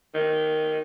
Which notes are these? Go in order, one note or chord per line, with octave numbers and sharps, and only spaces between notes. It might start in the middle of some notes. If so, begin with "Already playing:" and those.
D#3